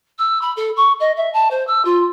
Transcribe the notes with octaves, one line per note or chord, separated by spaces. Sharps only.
E6
B5
A4
C#6
D#5
E5
A5
C5
E6
F4